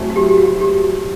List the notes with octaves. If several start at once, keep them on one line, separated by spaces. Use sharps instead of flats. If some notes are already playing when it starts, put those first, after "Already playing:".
Already playing: F#3 A3 C4 E4 G#4
F#4
G4
G4
F#4
G4